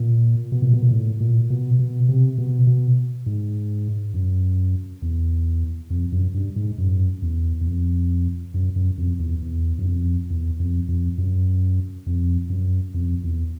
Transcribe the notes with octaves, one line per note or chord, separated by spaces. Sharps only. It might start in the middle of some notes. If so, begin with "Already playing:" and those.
Already playing: A#2
B2
A#2
B2
A#2
A2
A#2
B2
B2
C3
B2
B2
G#2
F#2
E2
F2
F#2
G2
G#2
F#2
E2
E2
F2
F#2
F#2
F2
E2
E2
F#2
F2
E2
F2
F2
F#2
F2
F#2
F2
E2